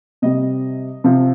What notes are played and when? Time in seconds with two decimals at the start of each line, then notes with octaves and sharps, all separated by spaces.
0.22 C3 G3 C4 D#5
1.04 C3 F3 C4